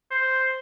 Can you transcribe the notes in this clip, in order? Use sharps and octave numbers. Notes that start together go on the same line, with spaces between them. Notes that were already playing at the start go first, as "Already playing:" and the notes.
C5